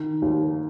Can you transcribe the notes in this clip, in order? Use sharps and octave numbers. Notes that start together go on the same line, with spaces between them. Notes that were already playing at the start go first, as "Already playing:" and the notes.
Already playing: D#3
D#2